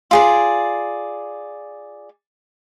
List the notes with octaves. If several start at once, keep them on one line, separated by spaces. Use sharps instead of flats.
F4 G#4 D5